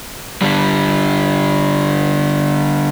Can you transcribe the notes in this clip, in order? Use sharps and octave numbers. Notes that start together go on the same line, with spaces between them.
D3 G3